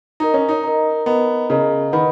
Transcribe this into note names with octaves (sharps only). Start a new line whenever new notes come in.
D#4 A#4 D#5 A#5
C#4
D#4
A#4 D#5 A#5
B3 A#4 D#5 A#5
C#3 A#4 D#5 A#5
D#3 B4 D#5 F#5 B5